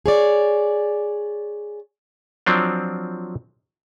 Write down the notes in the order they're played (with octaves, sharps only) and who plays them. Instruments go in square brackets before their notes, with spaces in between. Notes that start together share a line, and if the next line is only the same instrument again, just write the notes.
[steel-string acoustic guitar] G#4 C#5 D5
[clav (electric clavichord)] F3 F#3 C4 D4